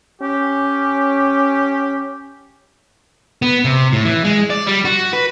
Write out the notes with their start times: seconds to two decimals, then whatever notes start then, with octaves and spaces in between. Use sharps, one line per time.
0.22 C#4 G4
3.42 B3
3.65 C3
3.93 A2
4.05 E3
4.24 G#3
4.50 D5
4.67 G3
4.85 F#4
5.13 B4